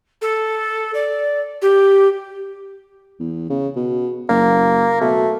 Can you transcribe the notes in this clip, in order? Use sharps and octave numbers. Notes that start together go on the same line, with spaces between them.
A4
D5
G4
E2
C#3
B2
F#1 A#3
B2 A3